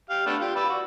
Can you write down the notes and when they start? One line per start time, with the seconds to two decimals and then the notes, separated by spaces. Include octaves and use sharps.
0.10 G4 F5
0.26 A3 B3 D4
0.41 F4 G4
0.56 B4 D5 E6
0.70 F#4